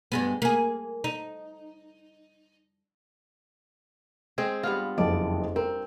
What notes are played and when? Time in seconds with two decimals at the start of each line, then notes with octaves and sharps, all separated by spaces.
0.12 G2 G#3 B3
0.42 A#3 G#4
1.04 D#4
4.38 G#3 C4 G#4
4.63 G2 B3 F4
4.98 F#1 F2 D5 D#5
5.56 C4 A#4